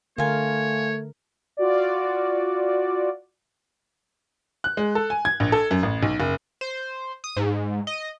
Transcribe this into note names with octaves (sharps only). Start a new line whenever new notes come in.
D3 A3 F4 A#4 C#5 G#5
F4 F#4 D5
F#6
G#3
A4
G#5
G#6
A#1
A4
F#2
A1
B1
F#1
C5
D#6
G#2
D#5